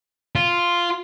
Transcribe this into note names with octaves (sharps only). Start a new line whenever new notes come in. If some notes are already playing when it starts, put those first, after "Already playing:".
F4